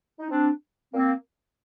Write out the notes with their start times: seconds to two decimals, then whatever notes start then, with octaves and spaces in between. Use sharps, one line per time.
0.20 D#4
0.30 C4 D4
0.93 A#3 C4